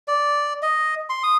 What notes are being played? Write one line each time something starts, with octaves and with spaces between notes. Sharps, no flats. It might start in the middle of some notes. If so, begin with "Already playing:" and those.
D5
D#5
C6
D#6